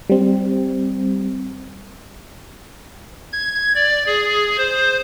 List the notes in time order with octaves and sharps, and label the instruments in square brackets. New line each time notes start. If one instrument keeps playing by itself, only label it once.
[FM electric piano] G3 C4
[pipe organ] G#6
D5
G#4
C5